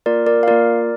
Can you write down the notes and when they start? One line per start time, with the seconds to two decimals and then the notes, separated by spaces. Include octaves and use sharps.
0.06 A#3 F4 A#4 D5
0.26 A#4 D5
0.43 F5
0.47 A#3 F4 A#4 D5